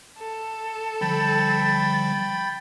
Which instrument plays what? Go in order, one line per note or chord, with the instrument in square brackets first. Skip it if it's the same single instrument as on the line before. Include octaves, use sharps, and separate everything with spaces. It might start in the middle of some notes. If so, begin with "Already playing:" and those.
[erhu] A4
[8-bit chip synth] D3 F3 G3 [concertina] G5 B5 [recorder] A6